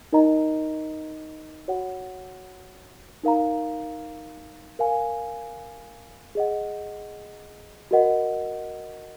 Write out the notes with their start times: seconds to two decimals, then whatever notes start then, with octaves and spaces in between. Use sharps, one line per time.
0.12 D#4 A#4 D#5 A#5
1.68 F#4 C#5 F#5
3.23 D#4 A#4 F5 A#5
4.79 A#4 F5 G#5
6.35 G#4 D#5 F#5
7.91 F#4 A#4 D#5 F#5